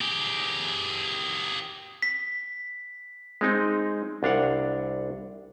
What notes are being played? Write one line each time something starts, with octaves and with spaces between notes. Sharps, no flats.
G4 G#4
B6
G#3 C4 D#4
C2 D4 F5 F#5